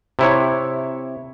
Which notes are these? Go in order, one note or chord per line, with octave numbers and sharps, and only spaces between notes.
C3 E4 C#5